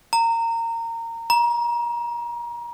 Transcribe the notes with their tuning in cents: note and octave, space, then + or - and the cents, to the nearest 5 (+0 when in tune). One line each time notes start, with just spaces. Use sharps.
A#5 -25
A#5 +30